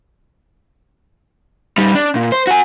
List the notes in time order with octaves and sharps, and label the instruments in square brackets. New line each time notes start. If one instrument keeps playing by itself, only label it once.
[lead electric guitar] G3 D#4
D4
A#2
C5
F#4 G#5